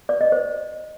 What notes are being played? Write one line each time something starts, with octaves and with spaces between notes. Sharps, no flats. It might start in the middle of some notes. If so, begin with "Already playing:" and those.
D5
D#5
C5